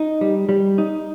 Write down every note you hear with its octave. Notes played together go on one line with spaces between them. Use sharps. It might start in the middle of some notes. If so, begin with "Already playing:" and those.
Already playing: D#4
G3
G3
D#4